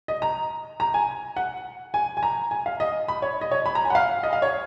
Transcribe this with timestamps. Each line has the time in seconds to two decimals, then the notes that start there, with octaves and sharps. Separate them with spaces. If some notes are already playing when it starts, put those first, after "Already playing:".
0.08 D#5
0.22 A#5
0.80 A#5
0.94 G#5
1.37 F#5
1.94 G#5
2.17 G#5
2.23 A#5
2.51 G#5
2.66 F5
2.80 D#5
3.08 B5
3.22 C#5
3.41 D#5
3.51 C#5
3.66 B5
3.75 A#5
3.85 G#5
3.90 F#5
3.95 F5
4.23 D#5
4.33 F5
4.42 C#5